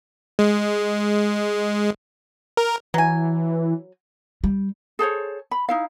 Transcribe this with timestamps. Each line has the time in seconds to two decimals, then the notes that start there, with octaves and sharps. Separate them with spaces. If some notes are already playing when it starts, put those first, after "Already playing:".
0.39 G#3
2.57 A#4
2.94 E3 F#3 G#5
4.44 G3
4.99 G#4 A4 C5 C#5
5.51 B5
5.69 D#4 E4 F5